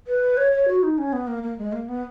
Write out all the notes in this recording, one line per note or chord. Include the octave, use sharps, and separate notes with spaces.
B4
C#5
C#5
F#4
D#4
C#4
B3
A#3
A#3
G#3
A#3
B3